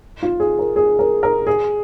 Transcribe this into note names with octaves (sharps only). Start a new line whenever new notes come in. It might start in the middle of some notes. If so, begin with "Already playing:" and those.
F4
G#4
A#4
G#4
A#4
A#4
G#4